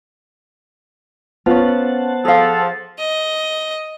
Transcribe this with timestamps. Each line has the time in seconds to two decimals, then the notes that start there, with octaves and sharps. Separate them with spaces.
1.46 B3 C#4 F4 C5 F#5 A5
2.25 F3 G#4 A4 F5
2.98 D#5